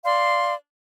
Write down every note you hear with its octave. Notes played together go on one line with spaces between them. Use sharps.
D5 F5 C6